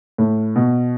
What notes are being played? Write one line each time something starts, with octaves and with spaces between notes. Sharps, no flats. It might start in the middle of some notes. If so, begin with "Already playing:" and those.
A2
B2